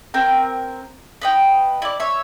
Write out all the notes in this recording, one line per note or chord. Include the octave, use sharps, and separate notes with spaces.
C4 A#4 G5
B4 D#5 G5
E4 D5
C#5 E5